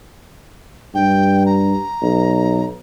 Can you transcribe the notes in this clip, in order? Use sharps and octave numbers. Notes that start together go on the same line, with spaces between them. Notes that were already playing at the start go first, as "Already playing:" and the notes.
G2 G5
A#5
B1